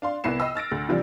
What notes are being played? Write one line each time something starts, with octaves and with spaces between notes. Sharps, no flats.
D4 F5 C6
C2 B3 E4 C7 E7
D#5 G5 B5 E6
F6 A6 A#6 D7
D2
C3 E3 F3 G3 D4